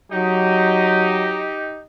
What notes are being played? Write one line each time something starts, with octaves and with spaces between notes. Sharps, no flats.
F#3 D#4 G4